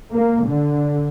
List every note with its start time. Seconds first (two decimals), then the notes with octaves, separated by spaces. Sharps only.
0.12 A#3
0.45 D3